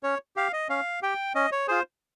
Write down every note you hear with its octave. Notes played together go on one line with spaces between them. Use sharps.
C#4 C#5
G4 F5
D#5
C#4 F5
G4 G5
C#4 D#5
C#5
F4 G#4 C5